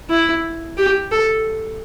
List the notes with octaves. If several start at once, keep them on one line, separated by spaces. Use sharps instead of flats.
E4
G4
A4